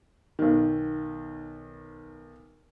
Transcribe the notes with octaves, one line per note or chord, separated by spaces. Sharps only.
B1 D#3